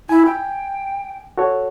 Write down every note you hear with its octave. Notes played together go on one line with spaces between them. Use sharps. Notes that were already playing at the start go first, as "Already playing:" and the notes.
E4 G#5
G5
F#4 A4 C#5